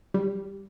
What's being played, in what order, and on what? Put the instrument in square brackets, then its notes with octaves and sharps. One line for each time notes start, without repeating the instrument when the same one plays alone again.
[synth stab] G3